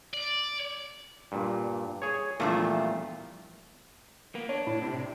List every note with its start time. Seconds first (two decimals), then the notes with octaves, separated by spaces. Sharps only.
0.13 D5
1.32 G2 A#2
2.02 G#4 C#5
2.40 E2 G2 A#2 F3 A3 F5
4.35 A#3 B3
4.49 D4 C#5 D5
4.67 A2 E4
4.82 C3